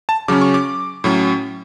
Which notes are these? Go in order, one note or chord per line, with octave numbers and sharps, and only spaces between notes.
A5
C#3 F#3 C#4 D6
C#6
D6
A2 F#3 C#4